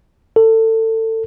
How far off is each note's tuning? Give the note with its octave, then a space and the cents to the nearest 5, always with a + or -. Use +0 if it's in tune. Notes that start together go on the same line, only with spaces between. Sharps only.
A4 +25